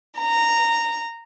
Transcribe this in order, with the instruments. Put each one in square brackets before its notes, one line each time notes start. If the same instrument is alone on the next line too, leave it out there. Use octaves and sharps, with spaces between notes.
[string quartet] A#5